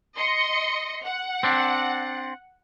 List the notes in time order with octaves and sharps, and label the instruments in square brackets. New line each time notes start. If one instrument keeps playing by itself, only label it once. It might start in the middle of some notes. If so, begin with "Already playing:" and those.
[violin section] D#5 C6 C#7
F#5
[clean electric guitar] C4 D4